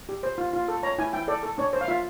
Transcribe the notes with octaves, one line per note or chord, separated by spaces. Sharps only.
G4
C5
F4
F4
A4
C#5 A#5
E4 G#5
E4 G5
A4 D5
A4
D4 C#5
C5
F5
F4 E5